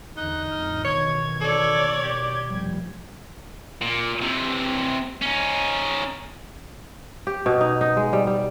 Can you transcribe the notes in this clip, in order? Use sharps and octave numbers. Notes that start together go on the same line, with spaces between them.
E2 D3 D#4 F#6
F2 A2 F6
B2 D#3 E3 C#5 G#6
A4 C#5 D5
G4
F1 F3 G3
A#2
C3 E3
C#4 D#4
G4
B2
D#4
D#4
G#3
G3
G3